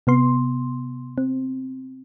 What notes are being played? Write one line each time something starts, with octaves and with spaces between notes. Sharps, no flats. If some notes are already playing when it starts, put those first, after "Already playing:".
C3 B3 C6
C4